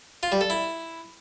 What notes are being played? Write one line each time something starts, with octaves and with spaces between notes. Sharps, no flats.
F4
G3
A4
E4